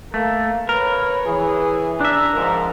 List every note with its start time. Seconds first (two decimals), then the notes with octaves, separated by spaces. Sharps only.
0.14 A3 A#3
0.69 A#4 B4 C#5
1.25 E3 G#4
2.01 D4 E5 A#5
2.34 G#2 F3 A#4